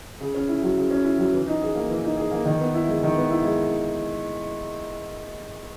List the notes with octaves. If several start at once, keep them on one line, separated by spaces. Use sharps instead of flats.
C#3
C#4
E4
F#3
C#3
C#4
E4
F#3
E3
D#4
G#4
A#3
E3
D#4
G#4
A#3
D#3
B3
E4
G#3
D#3
B3
E4
G#3